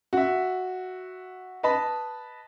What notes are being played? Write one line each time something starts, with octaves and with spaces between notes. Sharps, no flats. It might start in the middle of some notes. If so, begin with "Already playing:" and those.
F#4 E5
B4 D#5 A5 B5